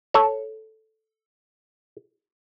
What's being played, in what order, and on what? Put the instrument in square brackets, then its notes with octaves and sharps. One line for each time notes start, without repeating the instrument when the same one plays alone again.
[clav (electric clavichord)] A4 C#5